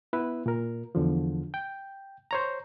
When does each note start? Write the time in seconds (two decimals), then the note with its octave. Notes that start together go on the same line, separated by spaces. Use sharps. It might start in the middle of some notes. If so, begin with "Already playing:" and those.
0.13 B3 E4 B4
0.46 A#2 A#4
0.95 E2 D3 F3
1.54 G5
2.31 C5 C#5 A#5